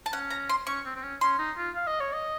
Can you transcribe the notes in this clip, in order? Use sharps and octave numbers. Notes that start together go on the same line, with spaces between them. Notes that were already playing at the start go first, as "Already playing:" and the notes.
A5
C#4 F#5
A#5
C6
C#4 C#6
C4
C4
C#4
C#4 C6
D#4
F4
F5
D#5
C#5
D#5